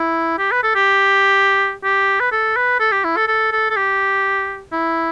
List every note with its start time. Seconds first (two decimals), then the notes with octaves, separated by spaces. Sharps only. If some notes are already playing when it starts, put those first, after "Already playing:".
Already playing: E4
0.39 G4
0.52 B4
0.63 A4
0.75 G4
1.84 G4
2.20 B4
2.32 A4
2.57 B4
2.80 A4
2.92 G4
3.04 E4
3.17 A4
3.28 A4
3.52 A4
3.70 A4
3.76 G4
4.73 E4